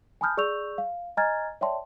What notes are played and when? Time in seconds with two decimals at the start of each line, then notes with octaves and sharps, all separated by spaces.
0.21 G#5 A5 B5 D#6 F6 G6
0.37 G#4 D5 C#6 E6 G6 F7
0.78 F5
1.17 D#5 G#5 A#5 F6 G#6 A6
1.61 C#5 D5 E5 G5 A5 C6